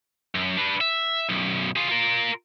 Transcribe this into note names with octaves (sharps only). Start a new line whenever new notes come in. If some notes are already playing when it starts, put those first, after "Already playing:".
F#2
D4 B4
E5
B1 F#2
F4 G#4
F4 A#4